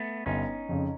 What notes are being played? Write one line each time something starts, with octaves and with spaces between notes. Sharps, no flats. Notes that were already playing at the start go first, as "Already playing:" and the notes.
Already playing: A3 B3
G1 C#4 D#4
F2 C#3